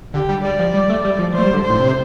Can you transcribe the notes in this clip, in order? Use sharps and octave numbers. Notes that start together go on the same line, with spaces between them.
D3 G4
G3
G3 D5
F3
G3
A3
G3
F3
F3 C5
A3
G3
D3
C5
A2
C3